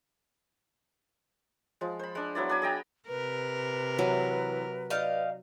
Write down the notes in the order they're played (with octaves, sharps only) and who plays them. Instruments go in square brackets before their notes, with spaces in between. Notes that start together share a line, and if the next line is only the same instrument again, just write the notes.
[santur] F3 G#3
C5 B5
G#3 D4
F#3 B3 E4 D5
D4 D5 G#5 B5
G#4 D#5 G5 A#5
[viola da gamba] C3 A#4 [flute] B4
[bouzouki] E3 [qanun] F#3
[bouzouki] D#4 D5 F5